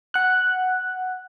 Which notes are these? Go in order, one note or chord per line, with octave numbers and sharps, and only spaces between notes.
F#5 F#6